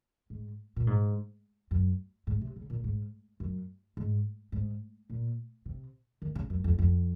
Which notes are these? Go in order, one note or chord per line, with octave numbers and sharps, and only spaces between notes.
G#2
A#2
G#2
F#2
G#2
C3
C#3
A#2
G#2
F#2
G#2
G#2
A#2
C3
D#3
C#3
F#2
F2
F2